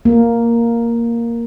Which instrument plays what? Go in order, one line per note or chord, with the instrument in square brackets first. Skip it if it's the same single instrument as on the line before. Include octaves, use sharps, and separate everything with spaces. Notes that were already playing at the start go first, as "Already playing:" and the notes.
[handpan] A#3